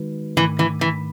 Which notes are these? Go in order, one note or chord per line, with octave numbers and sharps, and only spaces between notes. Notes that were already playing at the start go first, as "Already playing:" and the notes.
Already playing: D#3 G#3 D#4 F#4 B4
G#2 D#3 E3 A3
E3
E3